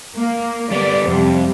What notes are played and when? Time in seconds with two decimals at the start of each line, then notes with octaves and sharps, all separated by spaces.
0.16 A#3
0.72 G3 B3 D5
1.07 F2 C3 G3